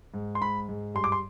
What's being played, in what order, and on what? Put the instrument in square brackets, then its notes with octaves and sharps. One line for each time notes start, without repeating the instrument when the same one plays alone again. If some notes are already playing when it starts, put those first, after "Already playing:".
[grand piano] G#2
C6
G#2 B5
G#2
G2 C6
D6
C6